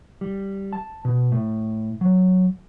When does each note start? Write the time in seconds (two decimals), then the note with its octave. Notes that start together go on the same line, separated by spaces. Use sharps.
0.21 G3
0.73 A5
1.05 B2
1.32 A2
2.01 F#3